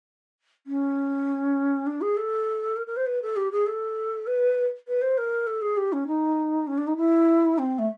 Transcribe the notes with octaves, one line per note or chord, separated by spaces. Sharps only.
C#4
D4
G#4
A4
A#4
A#4
C5
B4
A4
G4
G#4
A4
B4
B4
C5
A#4
A4
G#4
G4
C#4
D#4
C#4
D4
D#4
E4
C4
A3